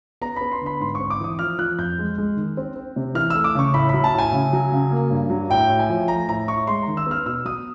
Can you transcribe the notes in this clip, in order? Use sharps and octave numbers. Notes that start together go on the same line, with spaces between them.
B3 A#5
B3 B5
C6
D3 B5
G#2 C6
C4 C#6
D6
E3 D#6
F3 F6
F3 F#6
F2 G6
G#3
G#3
D#3
C4
C4
C3
E3 F6
A3 E6
D6
C#3 C#6
A2 B5
F#3 B5
A5
A2 G#5
C#3
F#3
C#3
A#3
G2
F#3
A2 G5
A2
G#5
F3
A3 A#5
A2 A#5
A2 C#6
G#3 C6
A#5
D#3
E6
B3 F6
B2 E6
F#3 D#6